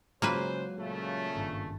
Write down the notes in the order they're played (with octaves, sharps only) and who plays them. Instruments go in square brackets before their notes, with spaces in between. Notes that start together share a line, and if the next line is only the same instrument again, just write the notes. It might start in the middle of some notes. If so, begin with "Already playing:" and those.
[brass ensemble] C#3 C5 [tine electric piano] F#3 G#3 [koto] A#3 F4 B4
[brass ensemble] A#2 C#3 A3
[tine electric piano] G#1 G2 A5